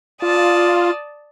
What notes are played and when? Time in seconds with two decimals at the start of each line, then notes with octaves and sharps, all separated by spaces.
0.22 F4 D5 A5 D#6